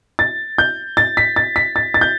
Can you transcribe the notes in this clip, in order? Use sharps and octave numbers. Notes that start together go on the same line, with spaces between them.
A6
G6
A6
B6
A6
B6
A6
A6
G6